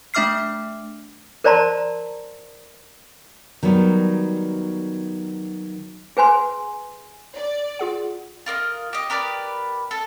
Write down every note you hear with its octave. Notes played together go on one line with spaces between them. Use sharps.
A3 D4 E5 D6 F6 C7
A#4 C5 D5 A5 A#5 C6
D#3 F#3 G3 B3
G#4 B4 G#5 C6
D5
F4 G#4 F#5
F4 A#4 D5 D#5
G4 D#5
G4 A#4 B4 D5
A4